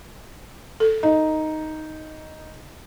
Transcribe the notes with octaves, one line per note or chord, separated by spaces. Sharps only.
A4
D#4